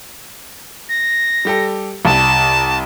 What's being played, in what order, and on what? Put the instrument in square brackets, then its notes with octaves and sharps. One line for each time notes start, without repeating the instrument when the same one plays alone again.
[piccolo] A#6
[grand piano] G3 G4 A4
[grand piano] C2 [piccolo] A5